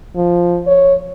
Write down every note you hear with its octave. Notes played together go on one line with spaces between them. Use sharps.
F3
C#5